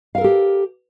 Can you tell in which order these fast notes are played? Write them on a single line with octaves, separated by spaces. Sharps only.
F5 A#4 A4 G4